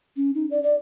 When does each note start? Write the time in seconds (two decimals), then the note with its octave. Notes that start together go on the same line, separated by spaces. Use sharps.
0.17 C#4
0.35 D#4
0.51 D5
0.63 D5